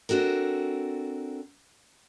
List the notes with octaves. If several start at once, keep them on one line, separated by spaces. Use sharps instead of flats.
C4 D4 F#4 A4 A#4